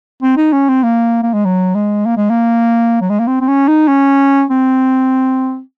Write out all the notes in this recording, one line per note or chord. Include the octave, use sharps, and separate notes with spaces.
C4
D#4
C#4
C4
A#3
A#3
G#3
F#3
G#3
A#3
G#3
A#3
F#3
G#3
A#3
C4
C4
C#4
D#4
C#4
C4